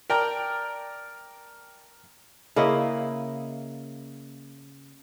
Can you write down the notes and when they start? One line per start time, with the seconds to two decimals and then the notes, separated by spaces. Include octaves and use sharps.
0.10 A#4 D5 G5 A5 A#5
2.56 C#3 A#3 E4 D#5